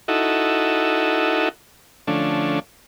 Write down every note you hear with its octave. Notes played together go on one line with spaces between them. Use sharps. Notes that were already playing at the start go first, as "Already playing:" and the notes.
D#4 E4 F#4 A4
D3 F3 A3 C#4 D4